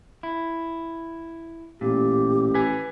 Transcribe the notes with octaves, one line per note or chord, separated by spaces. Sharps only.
E4
A1 A#2 G4
B4 G#5